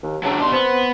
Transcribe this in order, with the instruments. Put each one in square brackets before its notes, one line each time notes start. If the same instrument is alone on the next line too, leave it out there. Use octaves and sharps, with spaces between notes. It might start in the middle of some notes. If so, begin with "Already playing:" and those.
[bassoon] D#2
[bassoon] C#3 [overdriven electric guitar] F#3 D4
[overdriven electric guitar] B2 C6 [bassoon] G3
[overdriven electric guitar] B3 [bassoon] C4